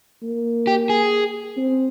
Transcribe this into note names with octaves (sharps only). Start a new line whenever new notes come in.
A#3
G4
G#4
C4